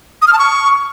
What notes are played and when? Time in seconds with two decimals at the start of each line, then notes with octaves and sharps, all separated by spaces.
0.22 D#6
0.27 F6
0.33 A5
0.39 C#6